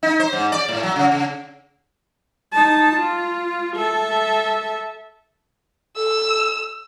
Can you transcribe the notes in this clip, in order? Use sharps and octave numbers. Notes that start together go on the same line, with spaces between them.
D#4
C5
G#2
D5
A2
F#3
C#3
C#3
D#4 A5
F4
A4 E5
A4 E6